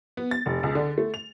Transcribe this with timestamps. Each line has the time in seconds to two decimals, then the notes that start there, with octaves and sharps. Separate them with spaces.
0.17 B3
0.31 A6
0.46 F1
0.63 C#2
0.75 D3
0.98 A3
1.14 F7